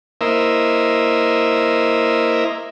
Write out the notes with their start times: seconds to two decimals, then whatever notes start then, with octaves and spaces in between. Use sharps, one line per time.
0.21 A#3 E4 A#4 C5 D#5 E5